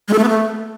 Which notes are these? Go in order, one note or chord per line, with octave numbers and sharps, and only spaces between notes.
G#3
A4
A3
B3
A3